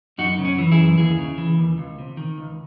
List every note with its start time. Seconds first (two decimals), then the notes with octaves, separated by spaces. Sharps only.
0.18 F#2 D#4 F#4
0.39 C#3
0.45 C#4
0.58 E3
0.72 E4 G#4
0.79 F#2
0.98 D#2 E4 G#4
1.18 C#3
1.38 E3
1.59 D#2
1.78 C#2
1.99 C3
2.17 D#3
2.38 C#2